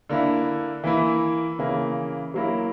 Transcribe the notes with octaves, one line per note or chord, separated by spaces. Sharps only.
D3 A#3 E4
E3 A#3 E4
C#3 E3 A#3
F#3 A#3 E4